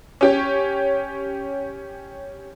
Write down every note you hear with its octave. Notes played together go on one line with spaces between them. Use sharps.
C#4 G4 C#5